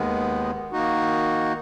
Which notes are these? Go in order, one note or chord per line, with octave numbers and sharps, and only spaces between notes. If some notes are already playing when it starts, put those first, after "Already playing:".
Already playing: D#2 D#3 G#3 B3
D#3 A#3 D#4 F#4